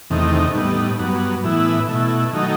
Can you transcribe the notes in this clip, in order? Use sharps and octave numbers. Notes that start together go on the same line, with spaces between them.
E2 C3 D#3 A3 D#4
A2 G3 B3 D#4
G2 F#3 B3
A2 E3 B3 E4
B2 A3 E4
D#3 F#3 A3 D#4